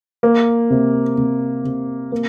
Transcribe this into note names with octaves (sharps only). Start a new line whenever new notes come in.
A#3
C3
C3
C3
A#3